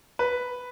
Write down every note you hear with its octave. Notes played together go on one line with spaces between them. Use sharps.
B4